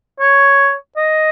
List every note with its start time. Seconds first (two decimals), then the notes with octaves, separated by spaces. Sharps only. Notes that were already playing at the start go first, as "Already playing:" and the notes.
0.20 C#5
0.97 D#5